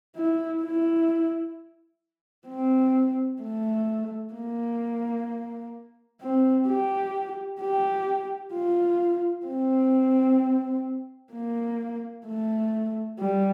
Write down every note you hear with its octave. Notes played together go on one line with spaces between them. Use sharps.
E4
E4
C4
A3
A#3
C4
G4
G4
F4
C4
A#3
A3
G3